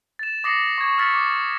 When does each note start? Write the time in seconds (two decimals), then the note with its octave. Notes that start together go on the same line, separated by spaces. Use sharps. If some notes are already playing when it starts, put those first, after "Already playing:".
0.19 A6 E7
0.44 D6 D#6 A#6 C7 C#7 F#7
0.78 C#6 D6 G#6
0.98 E6 F6 A6 B6 C#7 F#7
1.14 D6